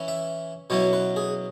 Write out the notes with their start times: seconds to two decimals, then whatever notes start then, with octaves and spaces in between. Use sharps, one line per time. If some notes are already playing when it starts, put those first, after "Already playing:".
Already playing: E3 C#4 E4
0.08 E5
0.70 B2 F#3 C#4 E4 C#5
0.93 B4
1.16 G#4